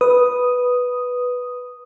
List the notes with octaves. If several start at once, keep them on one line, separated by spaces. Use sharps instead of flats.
B4 D#6